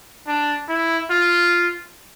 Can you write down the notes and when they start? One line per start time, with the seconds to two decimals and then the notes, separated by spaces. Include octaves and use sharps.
0.28 D4
0.69 E4
1.10 F4